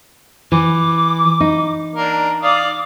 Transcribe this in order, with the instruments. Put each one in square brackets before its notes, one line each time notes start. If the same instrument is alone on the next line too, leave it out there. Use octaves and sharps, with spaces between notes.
[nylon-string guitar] E3 [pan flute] D6
[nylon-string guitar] D#4
[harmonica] A#3 D4
[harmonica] D5 F5 D#6 [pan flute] D6